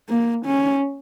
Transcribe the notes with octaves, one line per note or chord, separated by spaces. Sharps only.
A#3
C#4